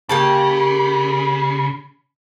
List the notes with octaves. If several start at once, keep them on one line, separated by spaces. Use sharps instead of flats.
C#3 A#3 G4 A5